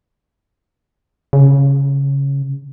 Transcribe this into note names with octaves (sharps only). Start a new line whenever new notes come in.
C#3